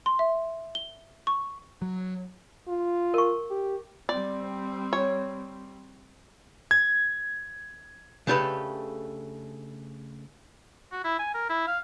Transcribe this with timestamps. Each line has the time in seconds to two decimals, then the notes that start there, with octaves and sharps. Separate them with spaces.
0.06 C6
0.19 E5
0.75 G7
1.27 C#6
1.82 F#3
2.68 F4
3.14 A#4 C#6
3.50 G4
4.09 G3 C4 D5
4.93 C#5
6.71 G#6
8.27 C#3 A3 D4 G4 A4 B4
10.92 F#4
11.04 E4
11.19 G#5
11.34 A#4
11.49 E4
11.67 F5